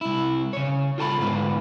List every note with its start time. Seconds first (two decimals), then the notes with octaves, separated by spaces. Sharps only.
0.01 C2 E4
0.53 C#3 C#5
0.98 F4 A4 A5 B5
1.18 D2 G#2 B3 F4 B4